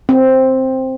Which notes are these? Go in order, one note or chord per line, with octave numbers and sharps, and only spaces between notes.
C4